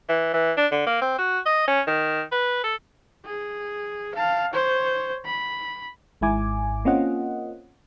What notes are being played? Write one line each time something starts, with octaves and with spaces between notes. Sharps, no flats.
E3
E3
D4
D3
A#3
C4
F#4
D#5
C#4
D#3
B4
A4
G#4
F5 A5
C5 C#5
B5
G#1 G#2 E4 G#5 D6
A#3 C4 C#4 F4 D#5 F#5